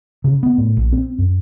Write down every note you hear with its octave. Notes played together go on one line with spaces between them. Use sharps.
C#3
B3
A2
A#1
C4
F#2